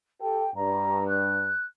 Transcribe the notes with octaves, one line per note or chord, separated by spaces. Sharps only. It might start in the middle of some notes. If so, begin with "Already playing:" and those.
G4 A4 G5
G2 A#5
F#6